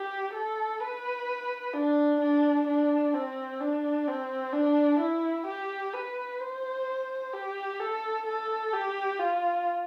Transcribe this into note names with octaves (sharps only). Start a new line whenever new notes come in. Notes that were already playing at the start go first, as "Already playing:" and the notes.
Already playing: G4
A4
B4
D4
D4
D4
C4
D4
C4
D4
E4
G4
B4
C5
G4
A4
A4
G4
F4